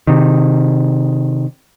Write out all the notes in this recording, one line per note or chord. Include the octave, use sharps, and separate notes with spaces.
C3 D#3